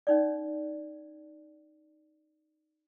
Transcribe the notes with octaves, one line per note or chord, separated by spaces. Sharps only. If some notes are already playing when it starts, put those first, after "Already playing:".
C#4 D#4 D5